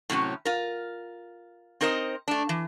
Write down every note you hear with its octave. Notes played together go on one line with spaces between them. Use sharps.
A2 C3 F#3 C#4
F4 A#4
C4 D#4 A#4 C5 D#5
A3 D4
E3